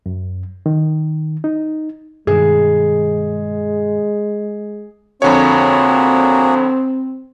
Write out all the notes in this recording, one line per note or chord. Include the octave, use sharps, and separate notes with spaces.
F#2
D#3
D#4
G2 B2 D#3 G#3 G#4
F2 D3 A#3 C4 F#4 G#4 C#5